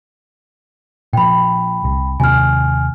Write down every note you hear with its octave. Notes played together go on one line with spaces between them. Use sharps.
A#2 F3 G5 B5
C2
D#2 C3 G#5 F6